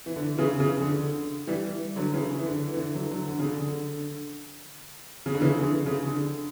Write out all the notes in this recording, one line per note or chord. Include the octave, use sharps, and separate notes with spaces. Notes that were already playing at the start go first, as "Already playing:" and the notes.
E3
D3
C#3 E3
C#3
D3
E3 G3
D3 F#3
C#3 E3
E3
D3
E3
D3
D3 F#3
D3 F#3
D3
C#3
D3
C#3
D3
C#3 E3
D3
C#3
D3